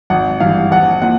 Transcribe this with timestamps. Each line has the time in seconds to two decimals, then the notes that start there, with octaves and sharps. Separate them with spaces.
0.10 G#1 F#5
0.40 G2 E3 F5
0.71 A#1 F#5
1.02 A#2 F#5